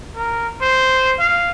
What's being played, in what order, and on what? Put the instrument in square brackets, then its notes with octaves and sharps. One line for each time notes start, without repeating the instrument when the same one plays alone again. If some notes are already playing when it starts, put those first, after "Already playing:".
[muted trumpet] A#4
C5
F5